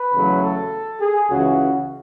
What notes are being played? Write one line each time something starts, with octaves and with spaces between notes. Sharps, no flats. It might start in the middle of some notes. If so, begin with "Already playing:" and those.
Already playing: B4
E2 C#3 F#3 A3
A4
G#4
C#2 C#3 E3 F#4